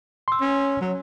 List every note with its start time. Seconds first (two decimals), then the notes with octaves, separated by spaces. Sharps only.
0.28 C6 E6
0.41 C#4
0.81 F#3